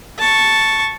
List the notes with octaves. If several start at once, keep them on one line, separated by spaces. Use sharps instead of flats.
A5 C#6